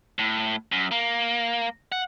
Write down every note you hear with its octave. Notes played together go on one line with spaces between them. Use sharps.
A2
F#2
A#3
F#5